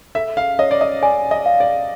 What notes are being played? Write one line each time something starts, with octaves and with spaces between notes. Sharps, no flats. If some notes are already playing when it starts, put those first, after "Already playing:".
A4 E5
F5
C#5 D#5
D5
D#5
D5 G#5
D#5
F5
D5